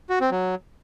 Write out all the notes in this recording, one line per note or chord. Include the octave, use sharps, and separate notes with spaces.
F#4
C4
F#3